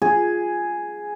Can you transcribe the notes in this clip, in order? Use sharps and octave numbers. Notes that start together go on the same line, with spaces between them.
G#4